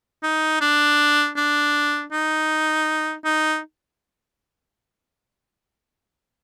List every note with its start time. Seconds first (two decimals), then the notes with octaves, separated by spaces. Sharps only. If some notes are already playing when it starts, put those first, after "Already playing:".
0.23 D#4
0.61 D4
1.36 D4
2.12 D#4
3.25 D#4